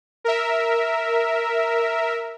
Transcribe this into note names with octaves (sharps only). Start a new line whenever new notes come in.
A#4 E5